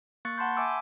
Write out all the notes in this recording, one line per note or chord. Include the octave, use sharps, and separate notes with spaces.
A#3 C#6 F#6 A6 C#7
F#5 A5 B5 C6 G6
E5 G#5 D6 E6